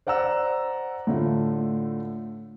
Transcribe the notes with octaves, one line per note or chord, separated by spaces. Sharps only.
C5 D5 F#5 A#5 E6
A2 D3 A3 F4